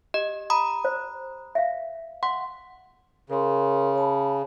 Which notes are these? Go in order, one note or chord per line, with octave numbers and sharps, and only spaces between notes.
G4 D#5
A#5 B5 D#6
C5
E5 F5
F#5 C6
C#3 A#4 C6
C#5 A5 B5